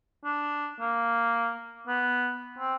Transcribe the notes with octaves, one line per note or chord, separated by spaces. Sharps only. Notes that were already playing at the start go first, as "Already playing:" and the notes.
D4
A#3
B3
C4